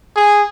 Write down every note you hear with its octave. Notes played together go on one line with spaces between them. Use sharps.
G#4